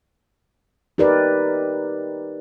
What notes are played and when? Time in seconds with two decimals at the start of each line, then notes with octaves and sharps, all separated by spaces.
0.98 D#4 G4 A#4 B4 D5